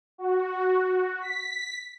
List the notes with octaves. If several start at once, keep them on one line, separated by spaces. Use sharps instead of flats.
F#4
B6